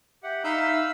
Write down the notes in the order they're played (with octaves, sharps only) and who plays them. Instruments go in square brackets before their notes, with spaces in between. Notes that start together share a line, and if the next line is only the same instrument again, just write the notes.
[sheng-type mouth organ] G4 F#5 [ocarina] E5
[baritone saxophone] D#4 [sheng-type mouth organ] F5 B5 E6